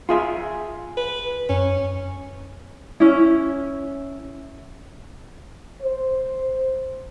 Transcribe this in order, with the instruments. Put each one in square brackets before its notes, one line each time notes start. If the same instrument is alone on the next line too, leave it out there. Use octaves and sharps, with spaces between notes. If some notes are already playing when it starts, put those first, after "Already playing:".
[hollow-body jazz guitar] F4 G#4 E5
[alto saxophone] B4
[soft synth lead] F#2 [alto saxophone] C#4
[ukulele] C#4 E4
[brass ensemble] C5